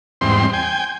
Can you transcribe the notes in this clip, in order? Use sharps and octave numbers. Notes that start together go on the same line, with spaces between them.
E2 G#2 G3 C4 C6
G5 G#5